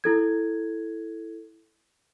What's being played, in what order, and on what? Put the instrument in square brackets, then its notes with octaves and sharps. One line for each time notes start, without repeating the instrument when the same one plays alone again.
[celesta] E4 A4 G#6